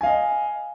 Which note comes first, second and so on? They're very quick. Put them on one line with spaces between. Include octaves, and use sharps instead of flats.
G#5 F5 D#5